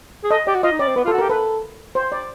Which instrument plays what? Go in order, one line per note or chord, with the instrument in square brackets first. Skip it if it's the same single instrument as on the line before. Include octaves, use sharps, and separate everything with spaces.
[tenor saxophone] G#4
[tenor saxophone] A4 [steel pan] D#5
[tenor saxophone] G4 [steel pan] D5
[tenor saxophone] F#4
[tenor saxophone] F4 [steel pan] D#5
[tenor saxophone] D#4
[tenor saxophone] C#4 [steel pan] D5
[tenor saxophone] C4
[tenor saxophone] B3 [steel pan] B4
[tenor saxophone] F4
[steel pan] A4
[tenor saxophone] F#4
[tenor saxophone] G4 [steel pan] A#4
[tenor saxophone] A4 [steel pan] B4
[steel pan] C5
D5